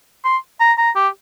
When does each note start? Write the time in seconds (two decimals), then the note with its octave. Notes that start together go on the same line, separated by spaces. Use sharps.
0.24 C6
0.60 A#5
0.78 A#5
0.95 G4